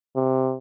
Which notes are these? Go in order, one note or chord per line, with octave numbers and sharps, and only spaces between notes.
C3